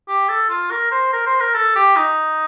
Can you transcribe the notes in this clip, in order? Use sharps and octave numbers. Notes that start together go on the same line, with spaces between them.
G4
A4
F4
A#4
C5
A#4
C5
A#4
A4
G4
D#4